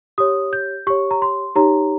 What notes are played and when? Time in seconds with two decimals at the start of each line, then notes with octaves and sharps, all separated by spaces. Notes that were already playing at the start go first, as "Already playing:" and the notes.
0.18 G4 C#5 D#6
0.53 G6
0.87 G4 C#5 C#6
1.11 A#5
1.22 C6
1.56 D#4 G4 C#5 A#5